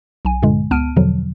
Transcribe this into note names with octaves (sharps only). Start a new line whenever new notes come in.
B1 G#5
G2 A#2 D3 G#3
C#2 B3 A5 F6 D7 D#7
E2 B2 D3 F3 F#3